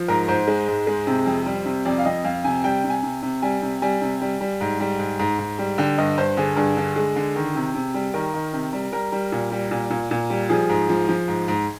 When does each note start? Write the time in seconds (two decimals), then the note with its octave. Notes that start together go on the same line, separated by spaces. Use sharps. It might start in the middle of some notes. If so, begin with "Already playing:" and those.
Already playing: F3
0.08 G#2 A#4
0.28 G#2 C5
0.48 G#3
0.68 G#2
0.87 G#3
1.07 C3
1.26 F2
1.46 G3
1.65 C3
1.85 F2 D5
1.98 F5
2.05 F2 D#5
2.25 F2 F5
2.44 C3 G#5
2.64 G3 G5
2.84 C3
2.90 G#5
3.03 C3
3.22 C3
3.42 G3 G#5
3.62 C3
3.82 G3 G#5
4.01 C3
4.21 G3
4.41 G3
4.61 G#2
4.80 G3
4.99 G#2
5.19 G#2
5.39 G#2
5.59 G3
5.78 D3 G5
5.98 G2 D#5
6.18 G2 C5
6.37 D3 G#4
6.56 G2 G#4
6.77 D3
6.96 G#3
7.16 D3
7.36 D#3
7.55 C3
7.75 C3
7.94 G3
8.14 D#3 A#4
8.34 D#3
8.53 C3
8.73 G3
8.92 G3 A#4
9.12 G3
9.32 A#2
9.52 G3
9.71 A#2
9.90 A#2
10.11 A#2
10.30 G3
10.50 F3 G#4
10.69 G#2
10.89 F3
11.09 F3
11.28 G#2
11.48 G#2